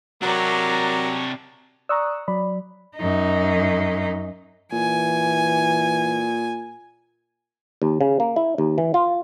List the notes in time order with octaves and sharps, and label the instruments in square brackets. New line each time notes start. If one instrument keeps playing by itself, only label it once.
[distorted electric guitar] C3 D4 [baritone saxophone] F#3 [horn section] A#4 A#5 [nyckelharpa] C#5 D5
[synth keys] D5 D#6 F#6 [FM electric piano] A#5 C#6 E6
[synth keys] F#3 [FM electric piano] D5 B5
[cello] F#2 D#4
[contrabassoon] A#2 [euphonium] E3 [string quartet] G#5
[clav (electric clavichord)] D#2
C#3
A#3
E4
D#2
E3
F4